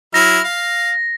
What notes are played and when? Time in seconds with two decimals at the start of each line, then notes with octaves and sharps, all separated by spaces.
0.14 F#3 E4 F6 A#6
0.44 F5